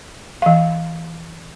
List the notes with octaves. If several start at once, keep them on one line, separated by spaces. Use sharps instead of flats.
E3 F5